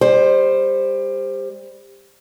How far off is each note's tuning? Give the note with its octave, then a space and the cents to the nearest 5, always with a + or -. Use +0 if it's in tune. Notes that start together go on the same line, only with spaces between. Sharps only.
G3 +25 C5 +5